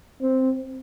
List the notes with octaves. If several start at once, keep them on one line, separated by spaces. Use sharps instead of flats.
C4